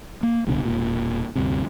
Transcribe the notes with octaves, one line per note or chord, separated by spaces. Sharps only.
A#3
D1 C2 B2 D3
E1 A#2
D2 G2 C3